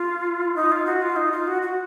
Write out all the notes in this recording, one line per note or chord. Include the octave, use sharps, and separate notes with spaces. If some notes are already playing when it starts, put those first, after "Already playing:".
Already playing: F4
D#4
F4
F#4
F4
D#4
F4
F#4
F#4